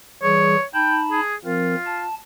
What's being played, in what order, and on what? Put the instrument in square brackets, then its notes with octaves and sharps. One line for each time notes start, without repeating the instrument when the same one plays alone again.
[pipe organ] E3 G3 G#4 [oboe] C#5
[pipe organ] D#4 A5 B5 [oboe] G5
[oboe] G#4
[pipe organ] F3 C4 A#4 [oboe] F4
[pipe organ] A5